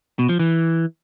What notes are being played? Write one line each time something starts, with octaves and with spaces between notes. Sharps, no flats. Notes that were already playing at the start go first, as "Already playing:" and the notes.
B2
F3
E3